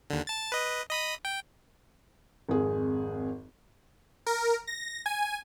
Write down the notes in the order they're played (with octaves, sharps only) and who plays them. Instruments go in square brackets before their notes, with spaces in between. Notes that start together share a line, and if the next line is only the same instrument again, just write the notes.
[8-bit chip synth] D#2 D3
A5 A6
B4 D#5
D#5 B5 D#6
G5
[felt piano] G#1 F2 G#4
[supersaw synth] A#4
A#6
G#5